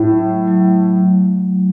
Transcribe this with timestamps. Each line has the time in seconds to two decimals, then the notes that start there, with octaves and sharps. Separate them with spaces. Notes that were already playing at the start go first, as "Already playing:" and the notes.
Already playing: A2 E4
0.10 F#3
0.29 A3
0.48 F#3
0.68 A3